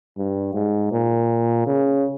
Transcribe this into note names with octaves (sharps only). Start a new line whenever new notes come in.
G2
G#2
A#2
C#3